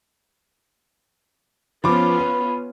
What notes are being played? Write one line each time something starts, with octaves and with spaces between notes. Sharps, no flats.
F3 B3 C#4 F4 B5 D6
B4